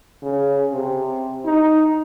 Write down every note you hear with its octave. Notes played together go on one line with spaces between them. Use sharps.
C#3
C3
D#4